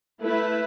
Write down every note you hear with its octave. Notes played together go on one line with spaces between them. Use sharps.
A3 E4 B4